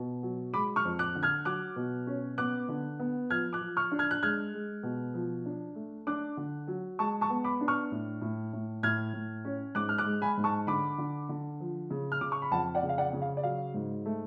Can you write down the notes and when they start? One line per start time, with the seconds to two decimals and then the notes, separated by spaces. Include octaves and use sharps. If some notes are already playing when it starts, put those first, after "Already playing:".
Already playing: B2
0.23 F#3
0.54 G#3 B5 D6
0.76 C#6 F6
0.85 F2
0.99 D6 F#6
1.15 D3
1.23 F6 G#6
1.45 F#3 D6 F#6
1.76 B2
2.07 C#4
2.38 B3 D6 F#6
2.69 D3
3.00 B3
3.30 F3 F6 G#6
3.53 D6 F#6
3.61 F3
3.77 C#6 F6
3.92 D4
3.99 F6 G#6
4.11 F#6
4.23 G#3 F6 G#6
4.54 G#3
4.83 B2
5.14 F3
5.46 D4
5.75 A3
6.07 D4 D6 F#6
6.37 D3
6.68 F#3
6.99 G#3 A5 C#6
7.21 A5 C#6
7.30 B3
7.44 B5 D6
7.61 D4
7.68 C#6 F6
7.92 A2
8.21 A2
8.53 A2
8.83 A2 F6 G#6
9.13 A2
9.45 C#4
9.75 G#2 D6 F#6
9.89 F6
9.98 D6 F#6
10.06 G#3
10.22 G#5 B5
10.37 G#2
10.44 A5 C#6
10.67 D3 B5 D6
10.98 D3
11.29 D3
11.60 F3
11.90 C#3
12.12 F6
12.21 C#3 D6
12.32 C#6
12.42 B5
12.52 F2 F#5 A5
12.75 D5 F#5
12.83 C#3
12.89 F5
12.98 D5 F#5
13.13 C#3
13.22 F5
13.37 D5
13.43 F#3 F5
13.74 G#2
14.06 A3